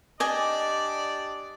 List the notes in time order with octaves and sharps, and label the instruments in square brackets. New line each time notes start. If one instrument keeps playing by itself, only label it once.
[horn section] D4 G4 D5 [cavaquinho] D#5 G#5